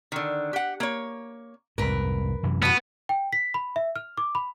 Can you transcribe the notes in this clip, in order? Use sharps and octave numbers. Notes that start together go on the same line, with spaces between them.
D3 D#3
G4 F#5
A#3 C#5
C2 F2 G#2 A#4 B4
F#2 C3 E3
A2 B3 F#4
G5
B6
B5
E5
F6
D6
B5